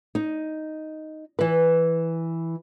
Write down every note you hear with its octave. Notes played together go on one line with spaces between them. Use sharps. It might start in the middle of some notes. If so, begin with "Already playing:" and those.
D#4
E3 B4